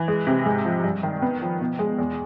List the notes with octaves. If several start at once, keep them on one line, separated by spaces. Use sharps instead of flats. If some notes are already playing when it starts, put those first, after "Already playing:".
Already playing: E3
G#3
C3
G#2
F3
G2
D#3
B3
F3
B2
G#3
E2